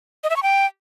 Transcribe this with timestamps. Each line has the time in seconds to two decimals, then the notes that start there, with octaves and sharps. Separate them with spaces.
0.24 D#5
0.30 E5
0.36 C#6
0.43 G5